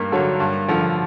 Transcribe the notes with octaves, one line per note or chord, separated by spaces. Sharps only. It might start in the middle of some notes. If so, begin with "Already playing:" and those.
Already playing: G2 A#3
D3 F#3
G2
D3 F3